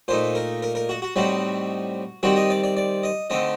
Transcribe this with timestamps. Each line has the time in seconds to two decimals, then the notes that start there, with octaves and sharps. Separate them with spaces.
0.08 A#2 A3 D#4 C5
0.35 A#4
0.62 A#4
0.75 A#4
0.89 F#4
1.02 F#4
1.16 A2 G3 C4 D#4 F#4
2.23 D#3 G3 C4 F#4
2.36 D#5
2.50 D5
2.64 D5
2.77 D5
3.03 D#5
3.30 D3 A3 C4 D#4 D#5